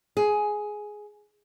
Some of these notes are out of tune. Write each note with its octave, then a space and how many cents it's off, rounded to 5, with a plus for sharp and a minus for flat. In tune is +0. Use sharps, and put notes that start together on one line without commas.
G#4 +10